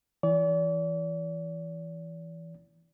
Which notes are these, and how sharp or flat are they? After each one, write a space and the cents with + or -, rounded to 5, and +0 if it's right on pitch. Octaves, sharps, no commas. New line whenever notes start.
E3 +0 D5 -40